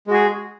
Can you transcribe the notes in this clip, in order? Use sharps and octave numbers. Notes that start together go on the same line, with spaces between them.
G#3 F#4 G#4